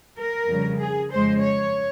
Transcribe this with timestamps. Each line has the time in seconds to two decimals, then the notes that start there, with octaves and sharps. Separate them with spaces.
0.18 A#4
0.50 F2 C#3 G3
0.81 G#4
1.13 F2 C#3 G#3 C5
1.44 C#5